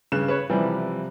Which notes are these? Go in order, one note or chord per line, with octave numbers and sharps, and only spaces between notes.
G2 C#3 F#6 E7
B4 C#5
C3 E3 F3 G3